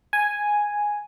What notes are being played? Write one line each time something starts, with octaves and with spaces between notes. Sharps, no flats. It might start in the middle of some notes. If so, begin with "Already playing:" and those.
G#5